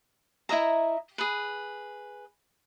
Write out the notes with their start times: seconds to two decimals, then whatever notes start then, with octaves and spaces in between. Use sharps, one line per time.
0.49 E4 D#5 E5 A#5
1.18 G#4 B4